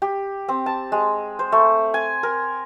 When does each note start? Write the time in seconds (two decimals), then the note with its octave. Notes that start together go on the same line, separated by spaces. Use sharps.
0.02 G4
0.49 C4
0.66 A5
0.92 G#3
1.39 C5
1.52 A3
1.94 G#5
2.23 A#4